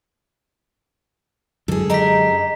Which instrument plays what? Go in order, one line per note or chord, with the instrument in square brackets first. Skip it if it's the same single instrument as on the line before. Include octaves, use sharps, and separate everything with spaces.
[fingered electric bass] F#2 D3 G#3 [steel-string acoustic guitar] G#4 A4
[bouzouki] D#4 G4 A#4 [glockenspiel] A#5 B6